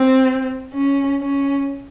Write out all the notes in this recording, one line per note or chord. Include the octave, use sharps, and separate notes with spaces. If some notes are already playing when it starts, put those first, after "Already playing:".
Already playing: C4
C#4
C#4